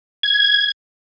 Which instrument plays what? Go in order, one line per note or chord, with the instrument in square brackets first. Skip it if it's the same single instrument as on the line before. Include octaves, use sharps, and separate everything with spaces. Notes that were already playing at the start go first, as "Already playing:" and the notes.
[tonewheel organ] G#6